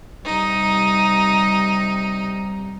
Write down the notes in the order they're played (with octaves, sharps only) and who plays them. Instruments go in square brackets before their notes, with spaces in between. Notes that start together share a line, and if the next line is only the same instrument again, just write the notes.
[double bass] C3 G3 [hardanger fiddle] D#4